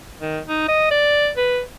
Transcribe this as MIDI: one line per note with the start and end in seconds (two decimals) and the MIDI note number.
0.21 0.39 51
0.48 0.65 63
0.68 0.90 75
0.91 1.30 74
1.37 1.61 71